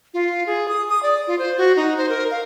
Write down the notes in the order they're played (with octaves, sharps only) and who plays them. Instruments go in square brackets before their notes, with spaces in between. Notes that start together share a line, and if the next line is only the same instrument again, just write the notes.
[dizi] F4
G#4
D#6
D#6
D5
F4
C5
F#4
D#4
C5
A#4
F5